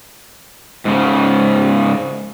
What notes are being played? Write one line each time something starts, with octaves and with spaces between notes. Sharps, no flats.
G#2 C#3